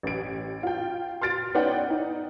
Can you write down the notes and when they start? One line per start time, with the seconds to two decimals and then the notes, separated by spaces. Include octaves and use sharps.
0.03 A1 D7
0.63 F4 G5
1.22 C6 F6 A6 D7
1.55 B3 C#4 D#4 D5 F#5 G5
1.90 D#4